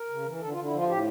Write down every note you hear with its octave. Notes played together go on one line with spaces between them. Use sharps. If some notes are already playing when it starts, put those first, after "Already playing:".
Already playing: A#4
C#3
E3
D3 A4
F4
D3
E4
F3 F4
A2 G4